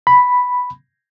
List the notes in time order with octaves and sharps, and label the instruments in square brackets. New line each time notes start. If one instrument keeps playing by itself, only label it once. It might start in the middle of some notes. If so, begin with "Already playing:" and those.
[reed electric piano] B5